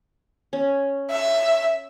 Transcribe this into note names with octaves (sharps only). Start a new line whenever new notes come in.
C#4
E5